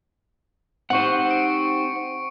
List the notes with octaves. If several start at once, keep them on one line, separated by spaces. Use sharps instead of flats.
C4 D#4 G4 C5 F#5 C#6 C#7
D7